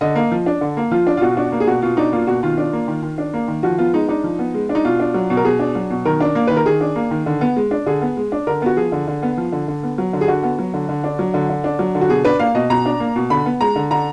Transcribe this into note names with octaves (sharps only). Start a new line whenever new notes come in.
D3 D#5
A#3
F3
D4
D3
A#3
F3 F4
D4
F4
B2 F#4
F4
D4 F#4
A#3
G#4
B2 F#4
B2 F4
D4 D#4
A#3 F4
B2 F#4
D#3 F4
D4
A#3
D#3
D#3
D4
A#3
D#3
F3 F#4
B3 F4
G#3 D#4
D4 D#4
F3
B3
G#3
D4
D#4
B2 F4
D4
F#3
B2
A#4
B2 G#4
D4
F#3
B2
D#3 A#4
D4
A#3
D#3 B4
A#4
D#3 G#4
D4
A#3
D#3
D3
B3
G#3
D4
D3 G#4
B3
G#3
D4
D3 A#4
B3 F#4
F3 G#4
D3
D3
B3
F3
D3
D3
B3
F#3
D3
G#4
D3 F#4
B3
F#3
D3
D3
D4
F#3
D3
D3
D4
F#3
D3
F#4
B2 G#4
D4 B4
A#3 F5
B2 D#5
B2 A#5
D4
A#3
B2
D3 B5
B3
G#3 A#5
D3
D3 A#5